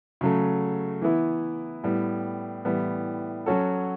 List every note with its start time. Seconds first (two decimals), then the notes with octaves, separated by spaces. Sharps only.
0.21 C#3 F#3 A3
1.02 E3 B3 E4
1.83 A2 G3 B3
2.65 A2 E3 G3 B3
3.46 F#3 C#4 F#4 A4